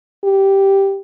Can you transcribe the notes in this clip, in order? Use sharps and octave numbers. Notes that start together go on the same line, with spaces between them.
G4